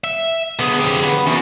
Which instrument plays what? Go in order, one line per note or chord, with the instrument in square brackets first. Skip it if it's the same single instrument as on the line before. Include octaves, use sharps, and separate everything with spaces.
[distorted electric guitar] E5
[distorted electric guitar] D3 G#4 [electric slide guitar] B3
[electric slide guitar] F2 G4
B4 F#5
[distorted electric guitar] E2 [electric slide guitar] C#4 F#4 A#4